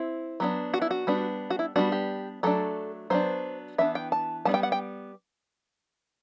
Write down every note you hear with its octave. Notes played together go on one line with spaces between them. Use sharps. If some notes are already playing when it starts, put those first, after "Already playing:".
Already playing: C4 E4
F#3 B3 D4
F#4
E4
F#4
G3 B3 D4
F#4
E4
G3 B3 D4 F#4
G4
F#3 A3 D4 A4
F#3 B3 D4 C5
E3 B3 D4 E5
G5
A5
G3 B3 D4 A5
G5
F#5
G5